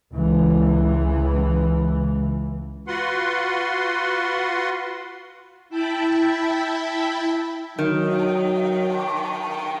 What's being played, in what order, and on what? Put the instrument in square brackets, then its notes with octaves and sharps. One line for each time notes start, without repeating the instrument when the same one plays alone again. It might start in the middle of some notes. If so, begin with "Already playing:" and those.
[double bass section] C#2 E3
[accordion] F4 F#4 B4 F#5 C6
[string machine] E4 E5 G5 A5 B5
[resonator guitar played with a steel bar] D#3 [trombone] F#3